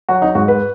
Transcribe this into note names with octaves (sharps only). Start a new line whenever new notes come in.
F#3 F#4
D#4
G#2 F#4
B4